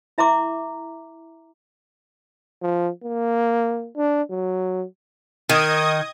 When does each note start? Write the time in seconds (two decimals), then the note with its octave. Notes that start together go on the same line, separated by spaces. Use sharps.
0.18 E4 E5 A#5 C6 D6
2.62 F3
3.03 A#3
3.97 D4
4.30 F#3
5.50 D#3 D#5 D#6 G#6